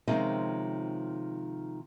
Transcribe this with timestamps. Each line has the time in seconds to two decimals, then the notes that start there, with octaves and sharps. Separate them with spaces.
0.08 C3 D#3 F3 G#3 C4 C#4